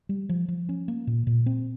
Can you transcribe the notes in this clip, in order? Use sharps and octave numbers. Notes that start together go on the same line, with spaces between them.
G3
F3
F3
C#4
A#3
A#2
A#2
C4